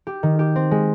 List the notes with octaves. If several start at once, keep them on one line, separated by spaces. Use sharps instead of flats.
G4
D#3
G4
C4
G#3